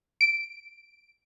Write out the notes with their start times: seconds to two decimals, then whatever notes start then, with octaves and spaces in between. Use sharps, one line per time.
0.21 D7